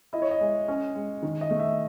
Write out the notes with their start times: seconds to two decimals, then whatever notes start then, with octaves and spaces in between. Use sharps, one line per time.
0.13 E4 D#5
0.22 C#5
0.31 D#5
0.41 G#3
0.68 C#4
0.96 G#3
1.23 D#3
1.41 D#5
1.50 A3
1.60 E5